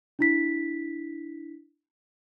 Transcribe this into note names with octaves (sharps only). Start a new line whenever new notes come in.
D4 E4 B6